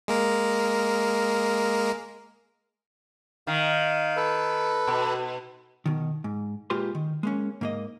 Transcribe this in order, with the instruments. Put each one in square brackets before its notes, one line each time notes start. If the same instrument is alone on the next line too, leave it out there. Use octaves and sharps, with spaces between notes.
[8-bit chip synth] G#3 A#3 A#4
[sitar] D#3 [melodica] F5
[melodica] A4 B4
[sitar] B2
[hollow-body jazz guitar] B2 D#3
G#2
A#2 G#3 F4 G4 B4 C6
D#3
G#3 A#3 C#4
G#2 A#3 D#5